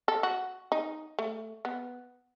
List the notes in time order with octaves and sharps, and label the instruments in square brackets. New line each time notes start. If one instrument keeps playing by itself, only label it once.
[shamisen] A4
F#4
D#4
A3
B3